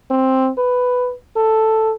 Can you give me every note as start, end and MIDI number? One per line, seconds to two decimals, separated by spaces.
0.11 0.50 60
0.58 1.14 71
1.37 1.94 69